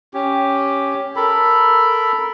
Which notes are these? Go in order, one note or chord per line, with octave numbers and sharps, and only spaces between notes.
C#4 G4
A4 A#4 B5